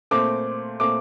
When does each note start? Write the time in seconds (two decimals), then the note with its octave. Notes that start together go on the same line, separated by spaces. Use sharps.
0.11 A#2 A3 C4 D6
0.80 A#2 A3 C4 D6